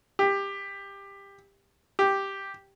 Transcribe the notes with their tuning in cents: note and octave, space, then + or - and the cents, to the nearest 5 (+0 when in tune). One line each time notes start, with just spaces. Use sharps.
G4 +15
G4 +0